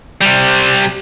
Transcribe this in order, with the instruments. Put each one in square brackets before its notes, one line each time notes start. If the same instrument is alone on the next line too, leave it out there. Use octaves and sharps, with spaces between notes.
[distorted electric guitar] C3 G3